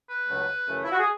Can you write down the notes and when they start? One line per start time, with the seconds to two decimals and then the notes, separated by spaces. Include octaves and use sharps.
0.10 B4
0.29 C#2 C#3 F#3 A3
0.68 F#2 C#3 E3 A3
0.84 E4
0.92 F#4
0.99 G#4